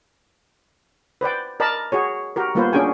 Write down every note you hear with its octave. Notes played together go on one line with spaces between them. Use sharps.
B4 C5 D5 G5
A#4 D5 D#5 A5 B5
F#4 G#4 C#5
F#4 G4 A#4
G3 A#3 B3 F4 B4 C5
C#4 D4 F#4 G#4 G5 G#5